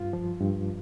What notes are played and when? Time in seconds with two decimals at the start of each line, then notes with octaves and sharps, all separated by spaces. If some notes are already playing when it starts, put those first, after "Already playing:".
Already playing: G2 F4
0.13 F3
0.41 G2